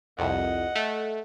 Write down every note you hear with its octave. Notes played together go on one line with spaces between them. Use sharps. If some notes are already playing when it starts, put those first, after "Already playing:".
C2 F2 D#5 F#5
A3